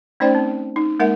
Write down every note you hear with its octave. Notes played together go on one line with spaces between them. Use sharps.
A3 C#4 D#4 C5 D5 G5
C4
D#4
G#3 A#3 D#4 A#4 E5 F#5